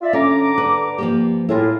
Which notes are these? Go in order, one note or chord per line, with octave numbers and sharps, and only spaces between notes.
F4 D5 E5
D3 C#4 A#5 D6
B4
F3 A#3 G4
A2 E4 F4 G#4 A#4